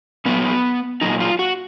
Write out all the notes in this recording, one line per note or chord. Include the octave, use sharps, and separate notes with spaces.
A#2 F#3 B3
A#2 F#3 D#4
F4
F#4